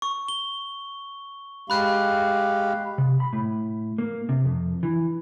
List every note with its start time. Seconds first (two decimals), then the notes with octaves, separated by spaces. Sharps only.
0.02 C#6
0.28 G7
1.70 G#3 G4 F5 B5 F#6
2.98 C3
3.20 B5
3.33 A2
3.98 A#3
4.29 C3
4.45 F2
4.83 E3